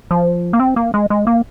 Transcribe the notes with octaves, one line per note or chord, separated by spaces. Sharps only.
F3
A#3
C4
A#3
G#3
G#3
A#3